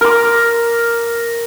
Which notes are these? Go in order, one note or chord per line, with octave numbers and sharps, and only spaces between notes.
A#4 D6